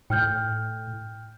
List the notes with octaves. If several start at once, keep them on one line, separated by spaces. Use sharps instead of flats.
A2 G5 F6 G6